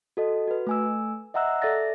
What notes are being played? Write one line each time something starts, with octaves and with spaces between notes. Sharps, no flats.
F#4 A4 D#5
F#4 B4
A3 G#5 E6
D#5 E5 F#5 A#5 E6 F#6
A4 D5 E5 A6 A#6